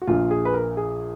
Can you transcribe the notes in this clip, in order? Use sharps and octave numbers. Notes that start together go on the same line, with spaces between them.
F#4
A#1 A#2 F4
G#4
B4
A#4
G#4